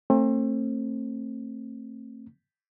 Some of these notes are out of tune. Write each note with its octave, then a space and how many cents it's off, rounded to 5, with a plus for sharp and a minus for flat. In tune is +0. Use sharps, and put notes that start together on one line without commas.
A3 +30 C4 +35